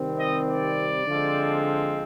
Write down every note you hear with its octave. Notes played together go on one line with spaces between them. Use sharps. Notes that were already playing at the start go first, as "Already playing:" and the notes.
Already playing: C3 D#3 G3 C4
D#5
D5
D3 F3 G#3 C4